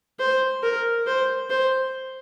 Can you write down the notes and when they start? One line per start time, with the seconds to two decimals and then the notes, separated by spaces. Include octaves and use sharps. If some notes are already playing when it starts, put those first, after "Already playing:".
0.19 C5
0.63 A#4
1.07 C5
1.50 C5